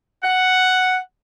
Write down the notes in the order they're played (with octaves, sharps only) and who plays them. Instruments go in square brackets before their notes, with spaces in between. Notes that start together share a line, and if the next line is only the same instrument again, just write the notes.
[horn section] F#5